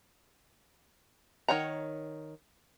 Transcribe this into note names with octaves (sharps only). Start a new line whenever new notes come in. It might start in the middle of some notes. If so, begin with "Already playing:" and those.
D#3 C#5 F#5 A#5